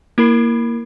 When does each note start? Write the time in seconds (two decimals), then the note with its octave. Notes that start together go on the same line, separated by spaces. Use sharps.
0.18 A#3 E4 A#4 B5 C7